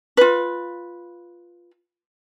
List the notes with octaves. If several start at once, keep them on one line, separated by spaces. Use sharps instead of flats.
F4 B4